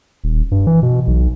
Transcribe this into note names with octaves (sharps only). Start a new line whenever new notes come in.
D#1
G2
E3
B2
B1